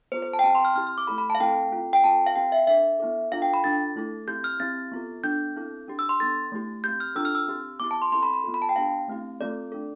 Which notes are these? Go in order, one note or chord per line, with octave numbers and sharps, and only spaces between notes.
B3 F4 A4 C5
C5
A5
G5
C4 G4 A5
C6
F6
C4 E4 G4 F6
F6
D6
A3 E4 A4 B5
B5
A5
F5
A3 C4 E4 A4 G5
C4 F4 A4
G5
C4 F4 A4 A5
F5
C4 G4 G5
E5
D4 A4 E5
B3 E4 A4
D4 F4 A4 F5
G5
B5
D4 F4 A4 A6
A3 E4 A4
C4 E4 G4 G6
F6
C4 E4 G4 A6
B3 F4 A4
B3 D4 A4 G6
C4 E4 A4
D4 G4
E6
C6
B3 D4 A4 A6
A3 E4 G4
C4 G4 G6
F6
D4 F4 A4 E6
F6
E6
C4 G4
B3 E4 G4 D6
A5
C6
C4 E4 A4 C6
B5
B5
B3 F4 A4
B5
A5
G5
B3 D4 G4 F5
A3 C4 E4 G4
A3 C4 F4 A4 D5
D4 A4